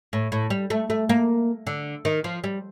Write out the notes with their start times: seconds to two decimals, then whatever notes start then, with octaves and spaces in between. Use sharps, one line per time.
0.13 A2
0.32 A2
0.50 G3
0.70 A3
0.90 A3
1.09 A#3
1.67 D3
2.05 D#3
2.24 F3
2.44 G3